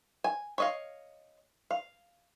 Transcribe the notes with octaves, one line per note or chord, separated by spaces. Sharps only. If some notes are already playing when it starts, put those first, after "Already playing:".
G#5
C#5 D#5 F5
F5